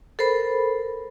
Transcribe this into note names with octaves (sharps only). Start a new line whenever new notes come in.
A4 A#4 C5 B5